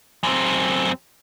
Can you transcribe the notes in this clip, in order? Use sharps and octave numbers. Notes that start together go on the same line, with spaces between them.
F#2 C4